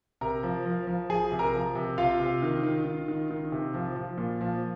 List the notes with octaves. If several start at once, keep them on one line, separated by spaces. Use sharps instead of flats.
C3 A#4 A#5
F3
F3
F3
F3 G#4 G#5
C3
A#4 A#5
F3
C3
C3 F4 F5
C3
D#3
D#3
D#3
D#3
D#3
C3
F3
F3
A#2
F3